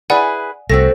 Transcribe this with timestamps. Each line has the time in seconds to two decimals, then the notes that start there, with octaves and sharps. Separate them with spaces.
0.10 E4 G#4 B4 D5 F#5 G#5
0.70 C2 A3 C4 F#4 A4 C5 A#6